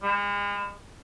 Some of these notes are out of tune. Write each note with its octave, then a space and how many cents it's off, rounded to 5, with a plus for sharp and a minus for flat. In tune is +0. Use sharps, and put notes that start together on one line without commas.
G#3 -40